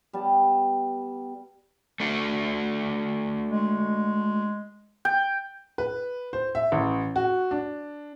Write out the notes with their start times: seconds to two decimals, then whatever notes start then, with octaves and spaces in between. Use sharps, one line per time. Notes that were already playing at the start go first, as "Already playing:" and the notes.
0.13 G3 B3 A5
2.00 A3 D4 F#4
3.50 G#3
5.05 G5
5.78 B4
6.33 C5
6.55 E5
6.72 A1
7.16 F#4
7.51 D4